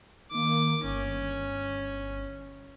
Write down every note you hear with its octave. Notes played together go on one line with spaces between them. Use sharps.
D#3 A#3 D6
G1 C#4